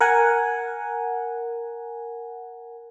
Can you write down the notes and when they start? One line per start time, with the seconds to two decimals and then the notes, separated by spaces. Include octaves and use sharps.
0.01 A#4 F#5 G#5